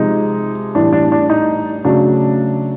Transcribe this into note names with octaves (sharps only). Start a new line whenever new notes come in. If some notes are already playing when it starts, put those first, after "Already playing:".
Already playing: C3 F3 G#3 D#4
A2 E3 G3 D4
D4
D4
D#4
C#3 F#3 A3 D4